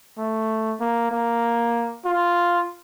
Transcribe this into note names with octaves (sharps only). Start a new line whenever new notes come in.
A3
A#3
A#3
F4